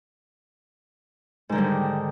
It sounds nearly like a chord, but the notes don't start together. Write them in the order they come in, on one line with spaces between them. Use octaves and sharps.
G#2 D#3 D3 G3